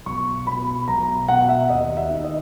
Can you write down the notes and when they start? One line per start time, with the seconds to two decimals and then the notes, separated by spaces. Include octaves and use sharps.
0.06 B1 C#6
0.47 B2 B5
0.88 B1 A#5
1.28 B2 F#5
1.49 E5
1.69 D#2 D#5
1.97 E5
2.10 D#3
2.24 D#5